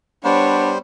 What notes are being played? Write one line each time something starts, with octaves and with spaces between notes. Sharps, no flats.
G3 B3 D4 C5 C#5